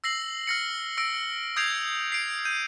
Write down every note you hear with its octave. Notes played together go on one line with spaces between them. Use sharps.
E6 A#6 C7 F#7
F6 A#6 C#7
E6 A#6 D7
D#6 G6 G#6 C7 D7 F7
C7 D7
G6 D#7